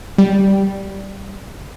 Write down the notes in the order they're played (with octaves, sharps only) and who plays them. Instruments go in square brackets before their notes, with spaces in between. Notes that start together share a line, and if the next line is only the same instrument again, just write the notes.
[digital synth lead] G3